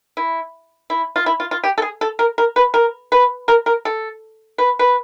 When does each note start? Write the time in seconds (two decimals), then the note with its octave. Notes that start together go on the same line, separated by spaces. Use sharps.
0.17 E4
0.90 E4
1.16 F4
1.26 E4
1.40 F4
1.51 F4
1.64 G4
1.78 A4
1.82 G#4
2.01 A4
2.19 A#4
2.38 A#4
2.56 B4
2.74 A#4
3.12 B4
3.48 A#4
3.66 A#4
3.85 A4
4.58 B4
4.79 B4